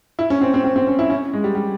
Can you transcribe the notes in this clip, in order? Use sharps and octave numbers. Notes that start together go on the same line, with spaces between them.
E4
C#4
C4
C4
C4
C4
C#4
E4
C#4
G#3
G3
G3